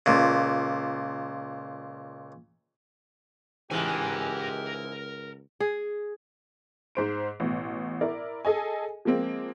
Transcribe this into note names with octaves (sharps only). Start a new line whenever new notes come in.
C#2 A#2
C#2 G#2 E3 G4 A#4 G#5
G#4
G#2 C5 D7
A1 B2
E4 A#4 D5
G#4 A4 D#5 G#5
F3 G#3 A#3 C4